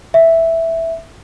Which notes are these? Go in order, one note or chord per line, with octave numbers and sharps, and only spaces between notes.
E5